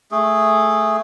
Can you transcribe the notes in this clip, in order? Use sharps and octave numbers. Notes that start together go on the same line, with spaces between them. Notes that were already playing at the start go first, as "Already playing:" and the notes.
A3 G#4